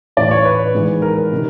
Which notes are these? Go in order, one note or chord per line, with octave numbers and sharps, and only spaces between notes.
A1 A2 E3 D5
C#5
B4
G#1 G#2 E3
A#4
C3 D#3